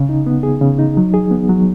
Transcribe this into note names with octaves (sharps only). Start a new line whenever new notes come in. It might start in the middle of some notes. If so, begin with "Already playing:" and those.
Already playing: C#3
D#4
B3
G#4
C#3
D#4
F#3
G#4
B3
F#3